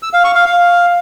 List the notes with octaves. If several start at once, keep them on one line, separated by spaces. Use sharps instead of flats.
E6
F5
C#6
F5
F5